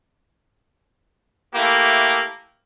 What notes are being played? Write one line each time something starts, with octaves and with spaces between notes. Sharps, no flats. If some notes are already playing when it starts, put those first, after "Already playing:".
A3 A#3 E4 G4 A4